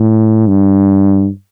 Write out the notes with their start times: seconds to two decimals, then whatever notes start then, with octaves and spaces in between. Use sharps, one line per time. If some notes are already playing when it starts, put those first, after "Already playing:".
Already playing: A2
0.47 G2